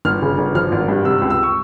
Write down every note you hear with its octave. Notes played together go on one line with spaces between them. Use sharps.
G1 F6
C#3
G1
F3 F6
G#1
G2
C3 E6
E6
C#2
E6
C#6